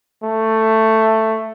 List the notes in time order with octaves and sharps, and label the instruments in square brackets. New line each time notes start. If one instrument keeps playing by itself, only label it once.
[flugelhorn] A3